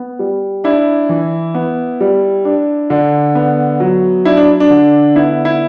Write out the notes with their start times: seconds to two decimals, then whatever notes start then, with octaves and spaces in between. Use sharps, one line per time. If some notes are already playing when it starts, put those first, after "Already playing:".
Already playing: B3
0.19 G3
0.64 D4 E4
1.09 E3
1.55 B3
2.01 G3
2.45 D4
2.90 D3
3.35 B3
3.80 F#3
4.25 D4 E4
4.37 D4
4.60 D4
4.70 D3
5.15 B3 E4
5.45 E4